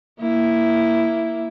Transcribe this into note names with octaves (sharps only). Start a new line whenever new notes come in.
A#3 E4